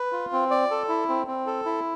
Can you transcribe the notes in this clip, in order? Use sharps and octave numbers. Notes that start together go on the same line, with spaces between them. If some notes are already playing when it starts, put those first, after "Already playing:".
Already playing: B4
F4
C4
D5
A4
E4
C4
C4
A4
E4